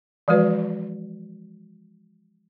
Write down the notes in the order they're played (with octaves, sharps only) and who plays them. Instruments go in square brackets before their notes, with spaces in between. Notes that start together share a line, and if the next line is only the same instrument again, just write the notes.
[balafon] E3 F3 G#3 F#4 B4